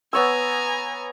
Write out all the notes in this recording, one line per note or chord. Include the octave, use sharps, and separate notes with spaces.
B3 C#5 G#5 A#5 E6